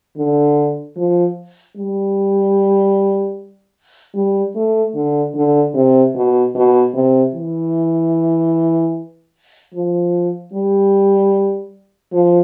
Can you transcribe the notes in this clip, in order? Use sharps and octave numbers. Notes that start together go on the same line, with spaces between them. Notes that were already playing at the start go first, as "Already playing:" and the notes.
D3
F3
G3
G3
A3
D3
D3
C3
B2
B2
C3
E3
F3
G3
F3